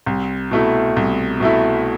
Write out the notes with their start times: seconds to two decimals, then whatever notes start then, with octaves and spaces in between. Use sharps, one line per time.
0.06 C2
0.51 B2 A3 E4
0.96 C2
1.40 B2 A3 E4